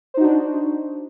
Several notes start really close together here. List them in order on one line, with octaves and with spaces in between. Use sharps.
C5 D#4 F#4 D4